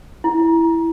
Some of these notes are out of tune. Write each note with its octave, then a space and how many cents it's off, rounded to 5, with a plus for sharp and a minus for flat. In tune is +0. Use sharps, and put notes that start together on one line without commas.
E4 +0